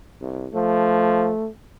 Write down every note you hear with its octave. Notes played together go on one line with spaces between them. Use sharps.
C2
F3 A3